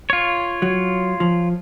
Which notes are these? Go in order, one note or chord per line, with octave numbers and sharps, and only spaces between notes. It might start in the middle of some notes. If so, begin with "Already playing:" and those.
F4 C#5
F#3
F3